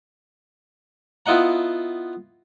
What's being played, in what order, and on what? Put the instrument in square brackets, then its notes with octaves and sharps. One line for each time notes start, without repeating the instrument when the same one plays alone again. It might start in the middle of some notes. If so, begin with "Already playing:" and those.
[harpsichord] B3 E4 F4 D#5 F#5 A#5